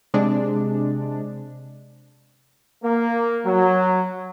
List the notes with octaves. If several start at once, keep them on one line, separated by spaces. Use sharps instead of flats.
C3 G#3 D4
A#3
F#3